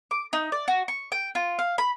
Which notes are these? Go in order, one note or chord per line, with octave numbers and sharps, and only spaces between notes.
D6
D#4
D5
F#4
C#6
G5
F4
F5
B5